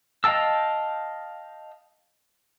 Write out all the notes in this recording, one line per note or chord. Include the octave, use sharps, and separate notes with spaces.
D#5 F5 G5 A5 E6